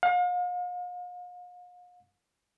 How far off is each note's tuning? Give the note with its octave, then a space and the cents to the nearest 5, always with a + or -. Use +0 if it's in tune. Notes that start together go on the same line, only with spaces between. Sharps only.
F5 +40